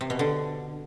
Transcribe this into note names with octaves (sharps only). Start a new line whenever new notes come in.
C3
B2
D3